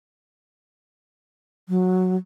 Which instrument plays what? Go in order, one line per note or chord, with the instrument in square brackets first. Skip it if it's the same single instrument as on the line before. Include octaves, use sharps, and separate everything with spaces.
[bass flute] F#3